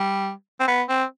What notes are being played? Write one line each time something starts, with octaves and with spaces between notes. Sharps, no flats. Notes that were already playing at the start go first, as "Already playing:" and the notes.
Already playing: G3
C4
B3
C4